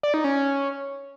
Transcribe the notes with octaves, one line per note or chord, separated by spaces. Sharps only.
D5
D#4
C#4
C#4